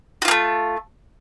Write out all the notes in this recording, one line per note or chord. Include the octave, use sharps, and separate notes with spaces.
A3 A#3 F4 F#4